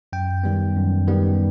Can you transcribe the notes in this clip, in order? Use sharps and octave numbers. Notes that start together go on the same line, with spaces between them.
F#2 G5
D#3 G3 B3
F#2
D#3 G3 B3